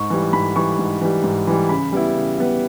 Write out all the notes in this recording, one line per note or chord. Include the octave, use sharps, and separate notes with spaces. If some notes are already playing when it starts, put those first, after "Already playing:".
Already playing: G#2 C#6
E3 G3
G#2 B5
E3 G3 C#6
G#2
E3 G3
G#2
E3 G3
C#3 B5
G3 B3 E4
C#3
G3 B3 E4